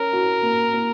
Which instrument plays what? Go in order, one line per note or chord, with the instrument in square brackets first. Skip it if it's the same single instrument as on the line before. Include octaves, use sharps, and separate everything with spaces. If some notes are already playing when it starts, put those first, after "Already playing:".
Already playing: [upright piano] C#4 [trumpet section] A#4
[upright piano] F#4
A#3
A#3